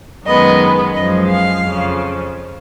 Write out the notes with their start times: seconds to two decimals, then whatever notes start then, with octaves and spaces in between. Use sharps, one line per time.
0.26 F#2 D#3 G#3 B3 D#5
0.94 F#2 F3 G#3 D#5
1.29 F5
1.63 F2 C#3 F3